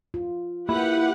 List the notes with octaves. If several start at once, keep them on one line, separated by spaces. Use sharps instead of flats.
F4
A#3 E4 G4 B4 F#5